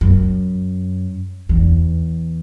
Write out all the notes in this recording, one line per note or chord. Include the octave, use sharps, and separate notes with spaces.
F#2
E2